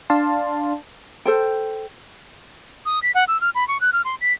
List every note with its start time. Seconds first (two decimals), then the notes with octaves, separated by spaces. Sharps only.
0.10 D4 D5 F5 A5 C6
1.25 A4 C5 G5
2.86 D#6
3.03 B6
3.15 F#5
3.28 E6
3.41 F6
3.55 B5
3.68 C#6
3.81 F#6
3.93 F6
4.05 C6
4.21 B6